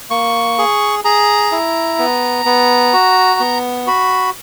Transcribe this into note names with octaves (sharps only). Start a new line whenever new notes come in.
A#3 C#6
G#4
G#4 A#5
E4
B3
B3
F#4
B3
F#4 B5